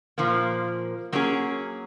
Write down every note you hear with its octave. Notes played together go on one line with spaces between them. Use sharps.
A#2 F3 A#3
F#3 A#3 C#4 G#4